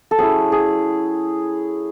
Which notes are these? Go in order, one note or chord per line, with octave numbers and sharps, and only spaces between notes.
A4
F#3 C#4 E4 G#4
G#4